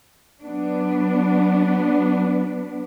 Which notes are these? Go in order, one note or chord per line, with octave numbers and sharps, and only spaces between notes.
F#3 B3 D4